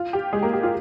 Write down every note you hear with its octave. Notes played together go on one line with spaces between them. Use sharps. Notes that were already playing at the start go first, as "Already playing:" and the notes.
Already playing: F4
G4
G#3 G#4
A#3 A#4
G4
F4